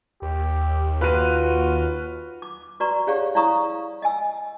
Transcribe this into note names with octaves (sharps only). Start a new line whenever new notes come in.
D#2 G4
F4 F#4 B4 D#7
D6
F#4 B4 D5 A#5 C#6
G4 G#4 C#5 D5 F5 F#5
E4 D5 F5 A#5 C#6 D#6
D#5 F#5 G#5 E6